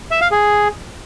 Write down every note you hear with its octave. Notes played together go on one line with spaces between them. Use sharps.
E5
F5
G#4